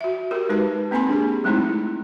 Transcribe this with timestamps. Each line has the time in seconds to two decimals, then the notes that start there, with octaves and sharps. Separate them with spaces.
0.01 F#4 E5
0.31 F#4 G4 A#4
0.49 G#3 D#4 B4 A5
0.91 A#3 C4 G#5 A5 B5 C6
1.08 D4 G4 G#4
1.44 F#3 G#3 A3 C4 D#4 E4